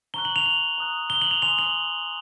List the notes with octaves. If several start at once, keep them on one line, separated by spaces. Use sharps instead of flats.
A#5 C#6 F#6 G7
F#7
F7
F#7
A#5 D#6 F#6
G7
F#7
F7
G#5 C6 D#6 F7
F#7